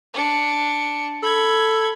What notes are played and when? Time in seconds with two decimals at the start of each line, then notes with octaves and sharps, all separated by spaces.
0.14 D4 C#7
1.23 A4 B5 G#6